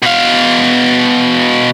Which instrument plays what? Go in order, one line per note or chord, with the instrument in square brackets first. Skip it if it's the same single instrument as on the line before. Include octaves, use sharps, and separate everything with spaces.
[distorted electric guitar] B2 F5